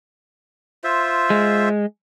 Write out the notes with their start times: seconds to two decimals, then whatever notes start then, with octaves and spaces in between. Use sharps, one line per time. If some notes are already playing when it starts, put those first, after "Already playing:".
0.84 F4 C5 E5
1.30 G#3